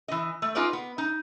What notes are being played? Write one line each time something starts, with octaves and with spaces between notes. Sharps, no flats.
E3 D#5
A3
D#4 F4 G#4 B4 D5
B3
D#4